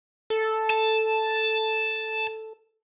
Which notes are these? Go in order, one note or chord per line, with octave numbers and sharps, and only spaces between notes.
A4
A5